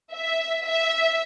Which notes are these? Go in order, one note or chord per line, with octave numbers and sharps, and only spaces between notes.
E5
E5